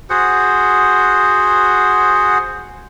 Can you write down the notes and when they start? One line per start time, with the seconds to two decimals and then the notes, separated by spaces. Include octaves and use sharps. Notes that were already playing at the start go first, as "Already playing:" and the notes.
0.10 F#4 G#4 C5 F#5